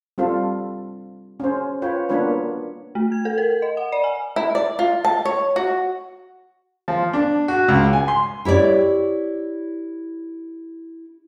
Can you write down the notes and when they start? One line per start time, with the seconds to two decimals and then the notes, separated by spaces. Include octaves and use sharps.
0.18 G3 C4 F4 A4
1.40 C#4 C5
1.82 F4 B4 C#5 G5
2.09 A#3 B3 D4 F4 B4 C#5
2.95 A3
3.12 G#6
3.25 A4
3.38 A#4
3.62 D#5
3.77 F#5
3.92 D5
4.04 G#5
4.36 E4
4.55 D5
4.79 F4
5.05 A5
5.25 C#5
5.56 F#4
6.88 F3
7.13 D4
7.48 F#4
7.68 C#2
7.93 G#5
8.08 C6
8.45 E4 G4 C#5 D5